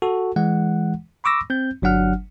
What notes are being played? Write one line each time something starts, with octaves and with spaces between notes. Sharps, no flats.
F#4 A4
E3 G#3 F#5
B5 C#6 D6 E6 A#6
C4 G6
G1 F#3 D4 F#5 F6